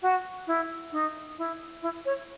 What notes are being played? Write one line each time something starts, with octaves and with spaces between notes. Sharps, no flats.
F#4
E4
D#4
E4
E4
C#5